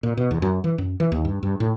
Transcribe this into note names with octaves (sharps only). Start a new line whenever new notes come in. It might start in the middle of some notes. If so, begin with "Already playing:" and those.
A#2
B2
E2
F#2
E3
F#2
E3
D#2
G2
G2
A2